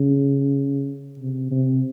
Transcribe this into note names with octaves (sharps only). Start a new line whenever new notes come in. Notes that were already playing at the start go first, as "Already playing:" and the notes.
Already playing: C#3
C3
C3